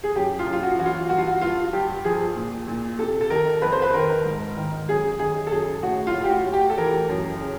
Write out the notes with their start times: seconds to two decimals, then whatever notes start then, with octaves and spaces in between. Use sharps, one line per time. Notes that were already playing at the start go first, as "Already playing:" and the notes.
0.03 G#4
0.15 F#2 G4
0.39 F4
0.46 F#2
0.53 F4
0.63 F#4
0.79 E3 F#4
0.86 F4
1.09 G2 F#4
1.18 F4
1.27 F#4
1.41 G2 F4
1.73 G2 G4
2.05 F3 G#4
2.36 A#2
2.67 A#2
2.99 C3 A4
3.21 A4
3.30 D#3 A#4
3.62 F2 B4
3.72 C5
3.82 B4
3.94 D#3 A#4
4.25 G#2
4.57 D#3
4.88 F#2 G#4
5.19 D#3 G#4
5.47 A4
5.51 F#2 G#4
5.83 A2 F#4
6.07 F4
6.15 A2
6.24 G4
6.30 F#4
6.46 A2
6.53 G4
6.70 A4
6.77 E3 A#4
7.09 F#2
7.40 C#3